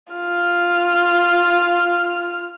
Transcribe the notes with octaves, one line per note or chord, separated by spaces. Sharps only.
F4 F6